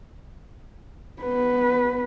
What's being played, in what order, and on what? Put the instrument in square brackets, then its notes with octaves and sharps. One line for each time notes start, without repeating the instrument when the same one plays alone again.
[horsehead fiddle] B3 B4